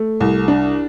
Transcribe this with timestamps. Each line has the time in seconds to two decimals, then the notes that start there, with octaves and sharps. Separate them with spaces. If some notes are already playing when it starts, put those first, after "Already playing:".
Already playing: A3
0.20 C2
0.48 D4